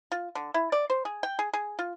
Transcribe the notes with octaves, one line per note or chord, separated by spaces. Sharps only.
F4
D3
E4
D5
C5
G#4
G5
G#4
G#4
F4